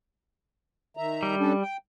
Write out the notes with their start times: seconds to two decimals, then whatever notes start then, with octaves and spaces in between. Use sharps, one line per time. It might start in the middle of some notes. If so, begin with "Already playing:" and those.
0.97 D#3 E5 A#5
1.23 G3
1.38 C#4 D4 A4
1.62 G5